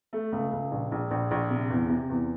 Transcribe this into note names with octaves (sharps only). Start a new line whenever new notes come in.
A3
C#2
C#2
A#1
A#1
A#1
A#1
C3
E2
C3
E2